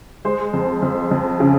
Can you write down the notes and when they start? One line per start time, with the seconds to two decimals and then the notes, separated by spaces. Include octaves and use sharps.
0.25 G#3 C5
0.53 F2
0.82 F2
1.11 F2
1.40 C#3